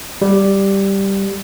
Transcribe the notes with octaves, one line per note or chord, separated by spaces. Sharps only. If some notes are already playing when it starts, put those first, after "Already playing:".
G3